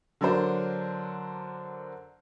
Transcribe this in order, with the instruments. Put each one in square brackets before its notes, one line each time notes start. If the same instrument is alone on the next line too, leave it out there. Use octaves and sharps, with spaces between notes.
[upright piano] D3 F#3 D4 A#4 C5